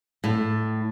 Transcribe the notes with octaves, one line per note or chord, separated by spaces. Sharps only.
A2